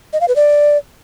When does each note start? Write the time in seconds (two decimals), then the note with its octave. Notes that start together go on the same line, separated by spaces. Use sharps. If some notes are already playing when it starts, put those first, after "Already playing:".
0.13 D#5
0.21 F5
0.28 B4
0.36 D5